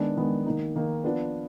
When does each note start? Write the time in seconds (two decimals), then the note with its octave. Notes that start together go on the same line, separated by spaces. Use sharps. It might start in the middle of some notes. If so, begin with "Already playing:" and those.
Already playing: D#3 G#3 B3 D4
0.17 D#3 G#3 B3 D4
0.46 D#3 A#3 D#4
0.76 D#3 A#3 D#4
1.04 F3 B3 D4 F4 B4